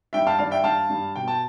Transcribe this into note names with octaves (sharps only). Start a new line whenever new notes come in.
G2 E5 G5
F5 A5
G2 D5 F5
E5 G5
G2 F5 A5
G2
B2 G5
A5